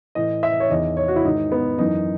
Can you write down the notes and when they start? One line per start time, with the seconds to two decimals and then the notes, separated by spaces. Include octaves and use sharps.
0.15 A2 E3 D#5
0.43 E5
0.60 C#5
0.70 E2 D#3 D#5
0.97 C#5
1.08 F#4
1.16 E4
1.24 G#2 D#3 D#4
1.52 B3
1.79 F#2 E3 D#4